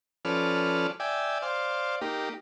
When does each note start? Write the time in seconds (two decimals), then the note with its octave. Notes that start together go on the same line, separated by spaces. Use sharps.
0.25 F3 C#4 A4 B4 D5 F6
1.00 D5 E5 G5 G#5
1.42 C5 D5 F5
2.01 A#3 D#4 G4